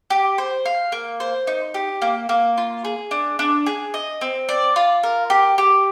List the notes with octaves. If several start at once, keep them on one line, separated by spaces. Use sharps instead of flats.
G4
C5
F5
A#3
C5
D#4
G4
A#3
A#3
F4
G#4
D4
D4
G#4
D#5
C4
D5
F4
A#4
G4
G4